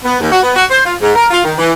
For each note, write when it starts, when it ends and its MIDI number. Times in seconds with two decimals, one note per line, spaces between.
0.05 0.16 59
0.20 0.30 39
0.32 0.41 66
0.43 0.55 59
0.56 0.65 66
0.71 0.82 72
0.85 0.95 65
1.01 1.14 44
1.16 1.27 70
1.31 1.42 65
1.44 1.53 51
1.58 1.72 52